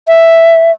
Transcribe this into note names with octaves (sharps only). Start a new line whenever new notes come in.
E5